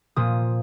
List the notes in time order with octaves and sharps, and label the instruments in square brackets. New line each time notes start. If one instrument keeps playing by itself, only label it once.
[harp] A#2 F3 D#6